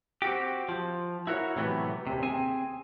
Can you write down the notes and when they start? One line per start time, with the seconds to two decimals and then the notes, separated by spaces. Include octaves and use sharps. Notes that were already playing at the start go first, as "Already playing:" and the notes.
0.22 C4 F#4 G4
0.69 F3
1.27 E4 F#4 A#4 C#5
1.56 A2 C3 E3 F#3 A3 B3
2.07 D#2 C3
2.23 C4 G#4 G#5